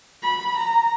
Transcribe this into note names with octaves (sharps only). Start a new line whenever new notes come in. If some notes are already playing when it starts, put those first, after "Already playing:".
B5
A#5